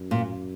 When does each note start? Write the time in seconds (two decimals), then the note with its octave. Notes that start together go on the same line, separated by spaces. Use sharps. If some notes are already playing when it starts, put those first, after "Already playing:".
Already playing: F#2
0.11 A#2